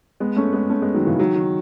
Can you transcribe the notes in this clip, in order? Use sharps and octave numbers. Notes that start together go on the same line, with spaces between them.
G#3 B3
A3 C#4
G#3 B3
A3 C#4
G#3 B3
D#3 F#3
C#3 E3
D#3 F#3
D#3